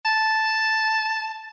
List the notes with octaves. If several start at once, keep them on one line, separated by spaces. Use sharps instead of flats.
A5